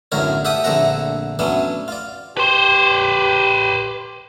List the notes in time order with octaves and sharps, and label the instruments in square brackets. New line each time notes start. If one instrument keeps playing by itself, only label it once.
[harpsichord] B1 F#2 A2 D3 A#4 C#5
G4 E5 F#5 A5 D#6
A#1 D3 A3 C4 F#5 A#5
F#3 A3 B3 C#4 D4
F4 D5
[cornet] G4 [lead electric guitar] B4 C5